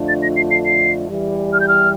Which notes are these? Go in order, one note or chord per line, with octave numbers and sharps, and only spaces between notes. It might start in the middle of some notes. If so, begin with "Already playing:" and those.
Already playing: F2 D3 A3 D4 F4
A6
A#6
C7
C7
C7
E2 E3 G3
F6
G6
F6